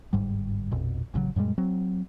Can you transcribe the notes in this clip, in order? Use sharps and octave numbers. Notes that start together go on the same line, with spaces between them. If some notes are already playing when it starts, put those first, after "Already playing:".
G1 G#2 G3
A#1 F2 B2
A1 G2 C#3 F#3
F#2 A#2 G3 G#3
F#3 C4